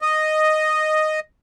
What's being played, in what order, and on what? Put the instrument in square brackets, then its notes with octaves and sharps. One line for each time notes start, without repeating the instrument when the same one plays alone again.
[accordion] D#5